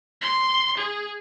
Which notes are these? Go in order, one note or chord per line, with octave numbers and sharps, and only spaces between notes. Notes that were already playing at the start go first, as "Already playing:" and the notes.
C6
G#4